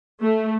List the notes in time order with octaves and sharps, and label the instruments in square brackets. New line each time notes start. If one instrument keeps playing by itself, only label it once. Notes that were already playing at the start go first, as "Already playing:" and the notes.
[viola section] A3